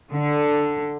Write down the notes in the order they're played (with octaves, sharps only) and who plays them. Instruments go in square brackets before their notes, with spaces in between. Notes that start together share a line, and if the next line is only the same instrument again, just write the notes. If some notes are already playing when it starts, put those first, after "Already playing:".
[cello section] D3